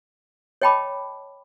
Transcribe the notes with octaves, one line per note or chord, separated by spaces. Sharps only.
C#5 D#5 G5 A5 B5 D6